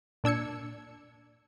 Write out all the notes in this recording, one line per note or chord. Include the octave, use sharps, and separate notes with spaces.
A#2 D4 E6 G#6 C#7